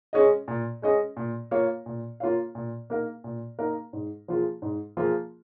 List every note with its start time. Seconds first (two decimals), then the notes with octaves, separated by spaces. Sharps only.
0.13 G#3 C#4 G#4 D#5
0.48 A#2
0.82 G#3 C#4 G#4 D#5
1.17 A#2
1.51 A#3 F4 C#5 F5
1.86 A#2
2.20 A#3 F4 C#5 F5
2.55 A#2
2.90 A#3 D#4 A#4 F5
3.24 A#2
3.59 A#3 D#4 A#4 F5
3.93 G#2
4.28 F3 A#3 F4 G#4
4.62 G#2
4.97 F3 A#3 F4 G#4